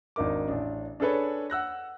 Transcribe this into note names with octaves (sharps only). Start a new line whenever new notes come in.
G#1 D4 D#4 A#4 D6
A1 D4
D4 G#4 A4 B4 C#5
F#5 E6 F#6 A#6